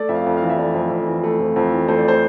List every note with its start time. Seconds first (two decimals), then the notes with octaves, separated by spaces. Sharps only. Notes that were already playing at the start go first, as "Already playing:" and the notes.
Already playing: A3 D5
0.09 F2 E5
0.15 F5
0.26 F2
0.37 F5
0.42 E3
0.50 E5
0.58 A3 D5
0.74 F2
0.91 F2
1.07 E3
1.24 A3
1.40 F2
1.56 F2
1.72 E3
1.88 A3 C5
1.98 D5
2.08 C5